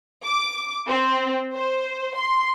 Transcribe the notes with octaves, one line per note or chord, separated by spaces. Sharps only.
D6
C4
C5
C6